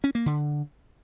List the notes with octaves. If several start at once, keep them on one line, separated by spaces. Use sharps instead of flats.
C#4
A#3
D3